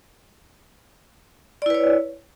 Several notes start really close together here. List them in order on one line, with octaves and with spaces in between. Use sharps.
D5 E4 B4 C#5